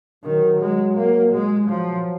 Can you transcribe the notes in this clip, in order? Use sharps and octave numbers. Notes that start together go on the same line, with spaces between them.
D#3 F#3
G#3
A#3
G#3
F3 F#3